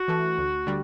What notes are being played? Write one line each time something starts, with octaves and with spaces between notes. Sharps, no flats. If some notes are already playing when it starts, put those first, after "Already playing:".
Already playing: F#4
E3 A3
D2
D3 G3